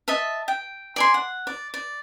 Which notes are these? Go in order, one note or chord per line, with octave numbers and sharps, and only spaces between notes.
D#5 E5 A5
G5
D5 G#5 C6
F#5
D5
D5